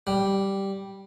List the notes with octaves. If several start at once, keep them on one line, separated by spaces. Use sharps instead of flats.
G3